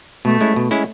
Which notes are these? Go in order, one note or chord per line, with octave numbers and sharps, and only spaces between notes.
B2 A3
G#3 C#4 E4
B2
G#3 C#4 E4